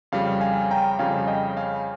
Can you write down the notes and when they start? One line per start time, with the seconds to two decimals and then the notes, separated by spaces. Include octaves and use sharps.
0.12 F2 C#3 G3 F5
0.41 F5 G#5
0.71 G5 A#5
0.99 F2 C#3 G3 F5 G#5
1.27 D#5 G5
1.57 F5 G#5